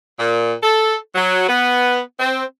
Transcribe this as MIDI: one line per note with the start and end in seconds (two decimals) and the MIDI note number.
0.19 0.53 46
0.62 0.95 69
1.15 1.47 54
1.49 1.99 59
2.19 2.43 60